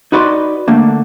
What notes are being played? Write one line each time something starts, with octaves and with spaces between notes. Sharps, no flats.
D#4 F#4 B4 D5 D#5 C6
D3 A3 A#3